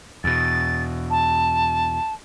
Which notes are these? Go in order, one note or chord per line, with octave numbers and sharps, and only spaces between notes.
E2 B2 A6
A5